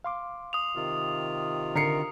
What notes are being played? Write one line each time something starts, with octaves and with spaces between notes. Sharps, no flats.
F5 C6 D6
D#6 F7
C3 D#3 F4
D3 A#4 C7 C#7